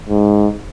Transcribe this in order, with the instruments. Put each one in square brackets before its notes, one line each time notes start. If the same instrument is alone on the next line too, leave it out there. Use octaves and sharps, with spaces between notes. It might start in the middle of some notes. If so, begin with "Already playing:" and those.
[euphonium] G#2